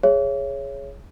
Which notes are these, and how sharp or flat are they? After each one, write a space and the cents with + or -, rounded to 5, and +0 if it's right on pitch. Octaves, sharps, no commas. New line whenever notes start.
G#4 +0 C#5 +0 E5 +35